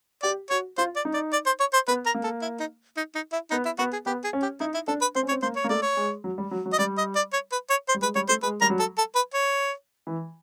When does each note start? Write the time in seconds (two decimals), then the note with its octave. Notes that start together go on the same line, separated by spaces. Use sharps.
0.23 G4 D5
0.50 F#4 C#5
0.77 F4 C5
0.96 D5
1.05 D#4
1.14 D5
1.33 D5
1.46 C5
1.60 C#5
1.73 C5
1.88 B3 B4
2.06 A#4
2.14 A#3
2.24 A4
2.42 E4
2.60 D#4
2.97 D#4
3.15 D#4
3.32 E4
3.51 B3 D#4
3.65 E4
3.78 B3 F#4
3.93 G#4
4.06 B3 G4
4.24 G#4
4.33 C#4
4.42 G4
4.60 D#4 E4
4.74 E4
4.88 D4 A4
5.01 B4
5.15 C4 C5
5.23 C#4
5.28 C#5
5.31 C4
5.43 A#3 C5
5.56 C#5
5.64 A#3
5.69 A3 D5
5.82 C#5
5.97 G#3
6.24 F#3
6.38 G3
6.51 F#3
6.66 F#3
6.73 D#5
6.79 G3 D5
6.98 D#5
7.16 D5
7.33 C#5
7.52 B4
7.70 C#5
7.89 C5
7.94 G3
8.02 G#3 B4
8.15 G3 C#5
8.29 A3 C5
8.43 G#3 B4
8.61 G3 A#4
8.70 F#3
8.79 A4
8.98 A4
9.15 B4
9.34 C#5
10.07 E3